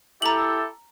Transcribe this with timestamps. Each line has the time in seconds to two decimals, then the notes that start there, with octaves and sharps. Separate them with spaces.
0.22 E4 G4 A4 A#5 F#7